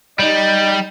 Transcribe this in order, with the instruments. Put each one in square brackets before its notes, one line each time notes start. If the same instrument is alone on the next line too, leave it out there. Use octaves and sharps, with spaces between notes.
[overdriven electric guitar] G3 [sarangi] D#4